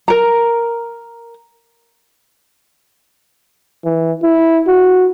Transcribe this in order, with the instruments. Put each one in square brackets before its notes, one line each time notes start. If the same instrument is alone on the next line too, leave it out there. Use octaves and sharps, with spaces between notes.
[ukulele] A#4 A#5
[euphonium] E3
E4
F#4